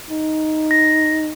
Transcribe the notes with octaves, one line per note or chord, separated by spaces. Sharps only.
D#4
A#6